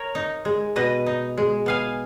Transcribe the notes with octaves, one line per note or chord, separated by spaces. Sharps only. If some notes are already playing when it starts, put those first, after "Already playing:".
Already playing: A#4 C#5
D#4
G#3
B2 B4 D#5
D#4
G#3
B3 F5 G#5